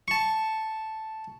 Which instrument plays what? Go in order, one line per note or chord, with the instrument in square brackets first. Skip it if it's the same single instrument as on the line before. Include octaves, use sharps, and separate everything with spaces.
[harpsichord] A5 C#6